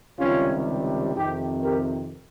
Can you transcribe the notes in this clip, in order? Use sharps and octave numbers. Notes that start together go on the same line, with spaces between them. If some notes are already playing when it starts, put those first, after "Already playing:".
C#2 C3 D#3 G3 C#4 F4
F2 C3 D#3 D#4 G4
G4 A#4